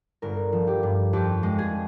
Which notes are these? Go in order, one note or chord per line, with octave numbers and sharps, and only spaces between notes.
G1 A#4
F3
G4
G2
F2 G4
G#3
G#4